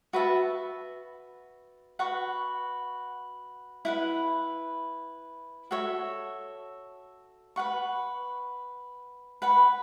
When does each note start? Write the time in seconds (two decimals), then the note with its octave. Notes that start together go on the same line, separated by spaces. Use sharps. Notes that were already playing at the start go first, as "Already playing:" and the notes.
0.13 F#4 B4 E5 A5
1.99 F#4 B4 F#5 C#6
3.85 E4 B4 F#5
5.71 F#4 A4 C#5 E5
7.56 B4 F#5 C#6
9.42 B4 F#5 B5